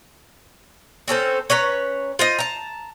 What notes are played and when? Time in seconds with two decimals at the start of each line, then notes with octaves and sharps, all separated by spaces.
1.08 C4 C#4 A4 C5
1.50 C#4 B4 C#5 A#5
2.19 F4 C5 D#5
2.39 A5 A#5